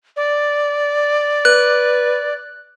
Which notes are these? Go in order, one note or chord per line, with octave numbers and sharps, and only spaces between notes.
D5
B4 F#6